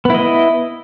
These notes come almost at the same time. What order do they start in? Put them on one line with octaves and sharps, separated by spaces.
B3 E4 D#5